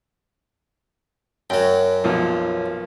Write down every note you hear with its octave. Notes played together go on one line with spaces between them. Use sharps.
F#2 F#3 G5
B1 A#2 F3